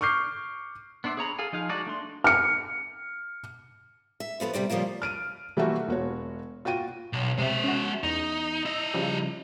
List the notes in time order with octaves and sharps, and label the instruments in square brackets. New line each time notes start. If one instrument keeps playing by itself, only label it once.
[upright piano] C#6 D6 F6 G6 C7
[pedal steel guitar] B3 D4 C5 D5 E5
G#4 C#5 A#5 B5
G#4 A4 F5 G#5
F3 D#4 G#4 F5
G#3 D#4 F#4 D5 A5
A3 D4 C6
[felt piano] F6 C#7
[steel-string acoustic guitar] E5
F3 B3 A4 B4
C3 G3 C4 D5
C#3 F3 G3 A#3 F4
[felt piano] F6 D7 D#7
E3 G3 A3 A#3 E4 F#4
E1 F#4 C#5
F4 F#4 G5 D#7
[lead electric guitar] B1
[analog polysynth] C3 C4 [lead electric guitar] G#3 E5
[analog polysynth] C#4 F#4
[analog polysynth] E2 [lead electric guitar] D#4
[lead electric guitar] E4 D#5 [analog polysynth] E6
[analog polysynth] C#3 F3 G3